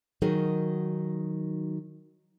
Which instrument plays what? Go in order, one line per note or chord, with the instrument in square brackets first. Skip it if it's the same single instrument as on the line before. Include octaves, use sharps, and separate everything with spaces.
[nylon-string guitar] D#3 F#3 D#4 F#4 G#4 A#4